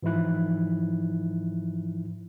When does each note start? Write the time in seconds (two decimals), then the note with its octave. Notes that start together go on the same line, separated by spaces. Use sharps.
0.03 G#2 E3 F3 D#4 E4 F#6